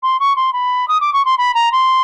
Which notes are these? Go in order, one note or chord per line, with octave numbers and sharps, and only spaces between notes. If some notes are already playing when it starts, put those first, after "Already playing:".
C6
C#6
C6
B5
D#6
D6
C#6
C6
B5
A#5
C6